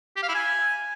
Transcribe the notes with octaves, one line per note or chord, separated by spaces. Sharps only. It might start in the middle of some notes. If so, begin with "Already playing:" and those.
G4
F5
E4
G#5